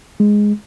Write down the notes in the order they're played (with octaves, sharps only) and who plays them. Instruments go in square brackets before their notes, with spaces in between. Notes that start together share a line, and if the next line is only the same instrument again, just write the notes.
[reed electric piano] G#3